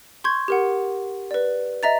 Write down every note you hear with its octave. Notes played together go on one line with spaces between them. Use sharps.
C6 C#6 G6 G#6
G4 A#4 F#5
B4 D5
D#5 E5 A#5 A6